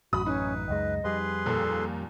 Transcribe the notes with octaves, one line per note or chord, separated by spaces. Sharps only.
A1 F#2 F#4 B5 D#6
C#4 D#4 B4
C#2 F#2 G#3 D#5
F2 G3 G#4 B4 C6
D#2 A#2 A4